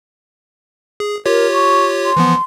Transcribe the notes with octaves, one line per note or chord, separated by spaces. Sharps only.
G#4
F4 G4 A#4 C#5
C#6
C6
E3 F3 B3